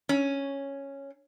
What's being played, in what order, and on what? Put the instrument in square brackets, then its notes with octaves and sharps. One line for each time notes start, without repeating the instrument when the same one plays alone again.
[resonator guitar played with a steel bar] C#4